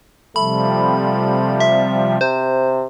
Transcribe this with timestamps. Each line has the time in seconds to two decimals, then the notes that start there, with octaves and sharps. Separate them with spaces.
0.36 C3 F3 G3 A3 B5
1.60 E5
2.21 C3 C5